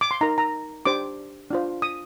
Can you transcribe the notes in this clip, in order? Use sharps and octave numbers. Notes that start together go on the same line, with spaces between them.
D6
C6
D#4 A#4 A#5
A#5
D4 G4 C5 D6
D4 F4 C5
D#6